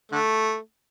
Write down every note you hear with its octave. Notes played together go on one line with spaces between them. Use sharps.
D3 A3